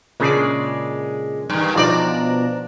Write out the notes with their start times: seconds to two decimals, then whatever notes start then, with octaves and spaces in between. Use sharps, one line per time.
0.20 A#2 C#3 G#3 D4 D5
1.50 G2 D#3
1.75 B2 F3 D4 D#4 F4 D5 A#5